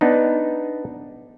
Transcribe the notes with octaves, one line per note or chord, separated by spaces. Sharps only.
B3 D4 D#4